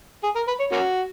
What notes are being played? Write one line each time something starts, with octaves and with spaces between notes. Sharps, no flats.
G#4
A#4
B4
C#5
A#3 C#4 F#4